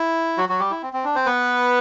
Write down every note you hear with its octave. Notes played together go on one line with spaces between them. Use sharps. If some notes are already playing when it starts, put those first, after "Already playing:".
Already playing: E4
F#3 F#4
F#3 F#4
G3 G4
E4
C4
C4
D4
C4 C5
B3 B4